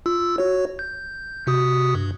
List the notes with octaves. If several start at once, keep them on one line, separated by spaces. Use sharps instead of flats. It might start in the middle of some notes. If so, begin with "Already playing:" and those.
F4 E6
F#4 C#5
G6
C3 F#4 D#6
G2